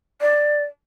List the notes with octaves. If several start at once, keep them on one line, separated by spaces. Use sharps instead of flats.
D5